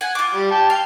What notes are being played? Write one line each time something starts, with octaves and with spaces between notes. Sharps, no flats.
F#5 G#5
F4 D6
G3
G4 G5 A5
F5 G5